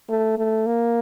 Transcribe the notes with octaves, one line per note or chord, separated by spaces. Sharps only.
A3
A3
A#3